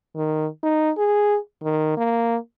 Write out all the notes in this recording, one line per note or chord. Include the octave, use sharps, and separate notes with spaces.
D#3
D#4
G#4
D#3
A#3